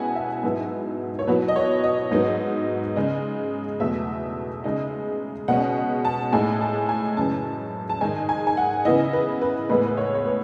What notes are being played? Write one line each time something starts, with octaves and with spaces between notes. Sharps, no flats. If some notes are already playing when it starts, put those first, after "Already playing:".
Already playing: B2 G#3 C#4 E4 F#5 G#5
E5
G#2 F#3 B3 E4
C#5
B2 F#3 B3 E4 B4
D#5
C#5
D#5
G#2 F#3 B3 D#4
C#3 G#3 D#4
E2 B2 F#3 A3 E5
C#3 G#3 D#4
B2 G#3 C#4 F#5
A5
A2 G#3 D#4 G#5
A5
G#5
F#2 C#3 E3 G#3 C#4 A5
A5
G#2 D#3 G#3 G#5
G#5
G#5
F#5
C#3 E3 B3 E4 D#5
B4
B4
A2 E3 G#3 B3 B4
B4
C#5
C#5
B4